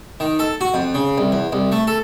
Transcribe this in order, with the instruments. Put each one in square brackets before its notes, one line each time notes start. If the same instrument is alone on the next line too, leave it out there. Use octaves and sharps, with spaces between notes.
[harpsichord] D#3
A4
F#4
F2
C#3
C2
E2
C2
A3
A4